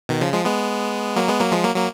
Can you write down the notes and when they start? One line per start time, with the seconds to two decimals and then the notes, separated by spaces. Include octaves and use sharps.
0.09 B2 D#3
0.21 C#3 F3
0.33 F3 G#3
0.45 G#3 B3
1.16 F#3 A#3
1.28 G#3 B3
1.40 F#3 A#3
1.52 F3 G#3
1.64 F#3 A#3
1.75 F#3 A#3